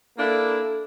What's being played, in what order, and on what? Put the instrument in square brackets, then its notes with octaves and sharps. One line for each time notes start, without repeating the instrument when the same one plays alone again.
[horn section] A#3 D4 E4 [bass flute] A4